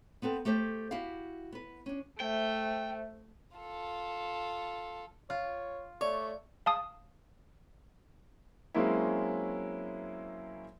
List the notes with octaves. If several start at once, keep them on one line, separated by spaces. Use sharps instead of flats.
B3 C4 A4 B4
A3 G4 A4 C5
E4 F#4 G4 F5
B3 B4
C#4 D4
A3 C5 E5 G5
F4 A4
F4 C#5
A3 C#5 D5
F5 A5 D#6
F#3 G#3 A#3 C4 C#4 E4